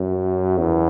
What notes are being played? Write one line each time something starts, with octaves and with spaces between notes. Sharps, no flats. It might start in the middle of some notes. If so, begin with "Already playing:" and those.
Already playing: F#2
E2